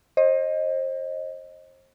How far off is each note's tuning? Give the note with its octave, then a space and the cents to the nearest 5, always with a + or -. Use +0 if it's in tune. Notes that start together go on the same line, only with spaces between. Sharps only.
C5 +35 D#5 +0